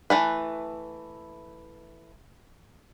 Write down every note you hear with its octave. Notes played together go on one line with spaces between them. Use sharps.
E3 A3 B4